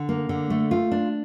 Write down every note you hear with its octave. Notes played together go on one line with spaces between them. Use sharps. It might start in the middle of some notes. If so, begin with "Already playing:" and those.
Already playing: D3
A#3
D3
A3
F4
D4